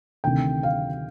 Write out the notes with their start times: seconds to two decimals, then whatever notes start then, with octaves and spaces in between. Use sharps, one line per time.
0.24 D2 C3 D#3 G5
0.63 F5